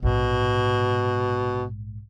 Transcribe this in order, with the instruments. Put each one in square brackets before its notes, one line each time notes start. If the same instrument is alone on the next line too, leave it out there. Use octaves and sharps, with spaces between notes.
[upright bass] A#1 G#2 [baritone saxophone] B2